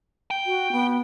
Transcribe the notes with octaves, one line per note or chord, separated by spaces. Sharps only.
G5
F#4
B3